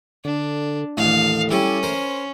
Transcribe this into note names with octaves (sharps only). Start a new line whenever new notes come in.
D3 D4
A1 D#2 A3 F5
G3 C#4 E4 G4
A#4 C5